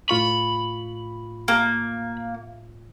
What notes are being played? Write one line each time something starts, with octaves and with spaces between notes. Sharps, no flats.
A2 F4 B5 C#6
A#3